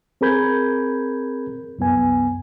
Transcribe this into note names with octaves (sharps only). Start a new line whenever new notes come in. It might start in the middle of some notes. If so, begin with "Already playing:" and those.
C4 G#4 A#4 B5 G6 G#6
C2 F#2 B3 G#5